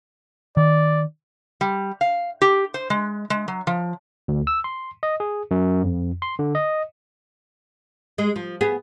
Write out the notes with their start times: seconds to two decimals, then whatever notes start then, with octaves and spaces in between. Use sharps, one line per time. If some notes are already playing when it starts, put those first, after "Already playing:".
0.57 D#3 D5
1.61 G3
2.01 F5
2.41 G4
2.74 C5
2.90 G#3
3.30 G#3
3.48 F#3
3.67 F3
4.28 D2
4.47 E6
4.64 C6
5.03 D#5
5.20 G#4
5.51 F#2
5.84 F2
6.22 C6
6.39 D3
6.55 D#5
8.18 G#3
8.36 F3
8.61 B3 G#4